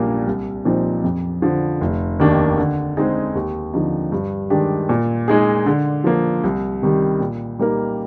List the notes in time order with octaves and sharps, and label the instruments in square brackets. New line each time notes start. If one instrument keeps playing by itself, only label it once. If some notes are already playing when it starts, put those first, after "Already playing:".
Already playing: [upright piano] A#1 A#2 G3 A#3 D4
C2
A#2 F3 C4 D#4
F2
D3 F3
F1
D#2 D#3 A#3 D4
D3
G#3 C4 D#4 G#4
D#2
D3 F3 C4 D#4
G2
D#3 G#3 D4 G4
A#2
G#3 D#4 G#4
D3
F3 A#3
C2
C3 D#3 G3
A#2
G3 A#3 D#4 A#4